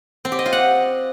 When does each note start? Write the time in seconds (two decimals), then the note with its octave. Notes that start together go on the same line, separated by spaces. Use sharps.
0.25 C4
0.32 G4
0.39 D#5
0.46 F4
0.53 F#5